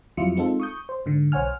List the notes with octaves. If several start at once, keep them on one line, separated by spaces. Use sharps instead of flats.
F2 F#3 G3 E4 F4 C#7
G#3 C4 D#4 F4 A4
C#6 D#6 G6
C5
G#2 D3
B1 C5 C#5 F#5 G#5 F6